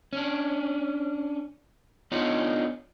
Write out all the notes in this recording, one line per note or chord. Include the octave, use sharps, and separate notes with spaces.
C#4 D4
B3 D4 D#4 F4 C#5